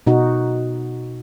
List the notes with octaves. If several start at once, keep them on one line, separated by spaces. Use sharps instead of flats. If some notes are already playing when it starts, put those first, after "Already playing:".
B2 D#4 F#4